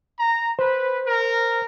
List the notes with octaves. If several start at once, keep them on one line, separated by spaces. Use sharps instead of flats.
A#5
B4 C5
A#4